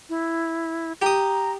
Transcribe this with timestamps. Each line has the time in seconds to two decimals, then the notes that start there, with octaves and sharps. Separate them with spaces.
0.10 E4
1.02 G4 A#5 D#6